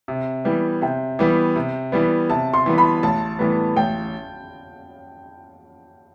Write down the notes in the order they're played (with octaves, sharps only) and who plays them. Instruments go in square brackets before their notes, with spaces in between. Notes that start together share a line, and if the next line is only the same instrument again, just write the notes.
[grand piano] C3
E3 G3 B3
[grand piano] C3 [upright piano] G5
[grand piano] E3 G3 B3
C3
E3 G3 B3
[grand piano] C3 [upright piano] A5
[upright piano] C6
[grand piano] E3 G3 B3
[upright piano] B5
[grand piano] A1 [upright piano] A5
[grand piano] A2 E3 G3 B3
[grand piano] A1 [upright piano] G5